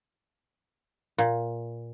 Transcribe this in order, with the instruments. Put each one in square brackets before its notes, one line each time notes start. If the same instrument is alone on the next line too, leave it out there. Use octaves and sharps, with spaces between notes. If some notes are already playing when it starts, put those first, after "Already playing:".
[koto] A#2